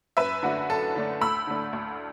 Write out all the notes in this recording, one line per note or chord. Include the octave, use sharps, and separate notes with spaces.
F#2 B4 E5
D3 A3 D4 F#4
F#2 A4
D3 A3 D4
D2 B5 E6
D3 A3 D4
D2